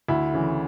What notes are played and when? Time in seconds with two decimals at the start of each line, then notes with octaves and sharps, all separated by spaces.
0.08 D2 E4
0.34 C#3 E3